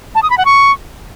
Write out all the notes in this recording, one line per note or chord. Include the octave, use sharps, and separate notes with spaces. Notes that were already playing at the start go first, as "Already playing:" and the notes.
A5
D#6
B5
F#5
C#6